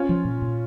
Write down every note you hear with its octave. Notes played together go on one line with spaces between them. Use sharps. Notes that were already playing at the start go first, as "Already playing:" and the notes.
Already playing: C#4 F4
F3
A#2
A#2